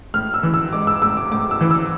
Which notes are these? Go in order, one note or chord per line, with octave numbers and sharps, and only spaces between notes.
A2 F6
E6
E3
E6
G#3 D6
E6
A2 E6
D6
A2 D6
E6
E3
E6